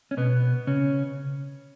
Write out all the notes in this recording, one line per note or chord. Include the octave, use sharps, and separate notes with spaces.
C#4
B2 B3
C#3 C#4